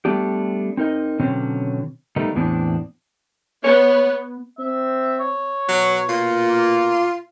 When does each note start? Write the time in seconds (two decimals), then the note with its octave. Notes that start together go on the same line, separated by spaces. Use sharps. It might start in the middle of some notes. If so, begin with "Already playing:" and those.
0.05 G3 A3 B3 D4 G4
0.77 C4 D#4 A#4 D#5
1.20 B2 D3 D#3 F#3 C4 C#4
2.16 D#3 G3 A3 B3 D#4
2.35 E2 A2 E3 B3 C4 D4
3.64 B3 C#5
4.59 C4 E5
5.20 C#5
5.68 B2 F#3
6.09 A#2 F4
6.48 A#3